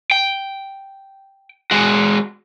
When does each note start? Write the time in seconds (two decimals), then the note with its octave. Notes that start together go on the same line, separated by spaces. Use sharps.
0.11 G5
1.71 G#3 F#4